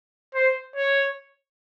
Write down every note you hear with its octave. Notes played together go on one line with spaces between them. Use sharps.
C5
C#5